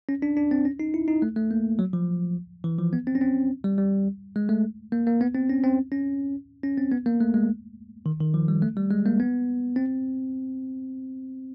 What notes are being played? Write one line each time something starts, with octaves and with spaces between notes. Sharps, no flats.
C#4
D4
D4
C4
C#4
D#4
E4
D#4
A3
A3
A#3
F#3
F3
E3
F3
B3
C4
C#4
C4
G3
G3
G#3
A3
A#3
A#3
B3
C4
C#4
C4
C#4
C#4
C4
B3
A#3
A3
G#3
D#3
D#3
F3
G3
A3
G3
G#3
A#3
B3
C4